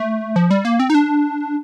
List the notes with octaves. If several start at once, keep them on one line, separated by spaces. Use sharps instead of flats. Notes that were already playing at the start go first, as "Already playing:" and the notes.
Already playing: A3
F3
G3
A#3
C4
D#4
D4